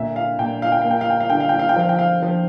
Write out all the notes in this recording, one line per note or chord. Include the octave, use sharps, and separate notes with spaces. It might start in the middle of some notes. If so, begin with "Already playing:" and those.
Already playing: A#2 D3 E5
F5
A#2 G5
F5
G5
A#3 F5
G5
F5
G5
F5
D3 G5
F5
G5
F5
G5
F3 F5
G5
F5
F3